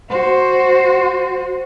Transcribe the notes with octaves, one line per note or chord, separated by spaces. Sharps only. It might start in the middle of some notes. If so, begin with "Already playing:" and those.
F#4 C5